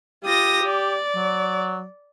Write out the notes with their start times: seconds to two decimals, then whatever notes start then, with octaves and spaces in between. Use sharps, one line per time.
0.24 F4 G4 D#6 A#6
0.64 D5
1.16 F#3